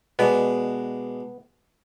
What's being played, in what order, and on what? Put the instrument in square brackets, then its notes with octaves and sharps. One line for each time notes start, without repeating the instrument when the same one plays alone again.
[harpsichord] B2 G#3 D4 [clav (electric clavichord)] B3